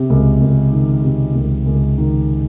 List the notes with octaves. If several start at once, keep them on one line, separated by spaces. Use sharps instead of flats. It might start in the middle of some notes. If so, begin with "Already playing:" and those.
Already playing: C3
C#2
C#2
D#3
C3
C#2
C#2
D#3